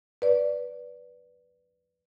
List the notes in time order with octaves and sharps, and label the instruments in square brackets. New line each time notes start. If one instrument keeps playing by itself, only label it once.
[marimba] B4 D5